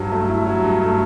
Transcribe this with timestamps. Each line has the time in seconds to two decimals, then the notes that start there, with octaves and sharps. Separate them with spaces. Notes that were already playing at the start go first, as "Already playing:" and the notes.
Already playing: G2 F#3
0.12 A3
0.29 E4
0.46 F#3
0.64 G2
0.81 A3